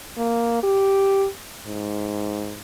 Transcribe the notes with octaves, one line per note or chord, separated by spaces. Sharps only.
A#3
G4
G#2